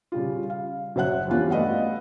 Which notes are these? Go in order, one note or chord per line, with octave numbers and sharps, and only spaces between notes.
C#3 G3 F4
F5
F#1 F#3 C5 E5 F#5 F#6
E2 G2 G3 A#3 C#4 F4
A3 B4 D5 D#5 F5 F#5